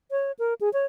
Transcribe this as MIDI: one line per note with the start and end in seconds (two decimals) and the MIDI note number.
0.11 0.32 73
0.39 0.54 70
0.61 0.72 68
0.73 0.86 73